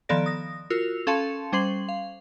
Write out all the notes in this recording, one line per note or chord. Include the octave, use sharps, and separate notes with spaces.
D#3 F3 B3 A4 D5 A#6
D#6 A#6
F4 F#4 A#4 E6 F7
C#4 A4 F5 A5 C6 C#7
G3 C#4 C5 C6 C7 F#7
F5